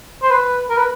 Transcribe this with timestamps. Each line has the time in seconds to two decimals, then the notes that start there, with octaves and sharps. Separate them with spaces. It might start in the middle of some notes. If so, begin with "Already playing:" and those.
0.23 C5
0.31 B4
0.70 A#4
0.78 B4